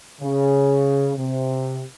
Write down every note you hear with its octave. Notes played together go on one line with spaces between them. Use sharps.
C#3
C3